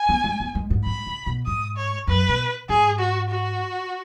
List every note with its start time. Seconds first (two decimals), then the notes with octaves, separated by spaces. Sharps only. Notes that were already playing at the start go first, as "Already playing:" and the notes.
Already playing: G#5
0.09 B3
0.24 G#3
0.40 B3
0.55 G#3
0.70 G#2
0.86 G#2 B5
1.06 C#3
1.26 B2
1.46 G#2 D#6
1.77 C#5
2.07 F#2 B4
2.29 B2
2.69 G#2 G#4
2.99 F#4
3.30 F#4